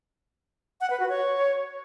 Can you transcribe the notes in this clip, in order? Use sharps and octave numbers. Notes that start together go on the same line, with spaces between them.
F#5
B4
F#4
C#5